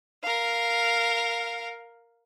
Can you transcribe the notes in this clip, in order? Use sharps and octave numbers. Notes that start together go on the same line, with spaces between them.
A#4 F5